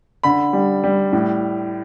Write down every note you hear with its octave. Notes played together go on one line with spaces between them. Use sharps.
D3 B5
G3
G3
A2